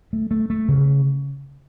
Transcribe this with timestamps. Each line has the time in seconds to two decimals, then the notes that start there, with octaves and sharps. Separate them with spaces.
0.13 A3
0.31 A3
0.50 A3
0.68 C#3